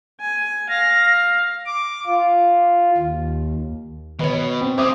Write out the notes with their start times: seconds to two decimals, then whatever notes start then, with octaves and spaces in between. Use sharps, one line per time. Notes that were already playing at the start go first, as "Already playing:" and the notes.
0.20 G#5
0.69 F5 A#6
1.66 D6
2.06 F4
2.98 D#2
4.19 B2 D#3 B4 C#5 D#5
4.61 C4
4.78 F#3 C4 C5 E5 D6 D#6